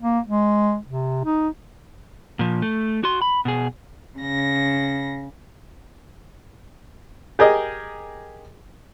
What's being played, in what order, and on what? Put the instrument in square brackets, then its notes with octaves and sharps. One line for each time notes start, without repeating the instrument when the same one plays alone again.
[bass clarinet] A#3
G#3
C3
D#4
[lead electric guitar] A#2 F3
A3
F#4 C6
B5
B2 G#4
[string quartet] C#3 A#6
[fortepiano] G4 G#4 A#4 D#5